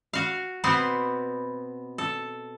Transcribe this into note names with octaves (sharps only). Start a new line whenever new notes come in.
F#4 F5
B2 B3 C4 C5
A4